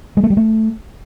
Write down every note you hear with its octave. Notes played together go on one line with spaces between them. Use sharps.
G#3
A3
G3
A3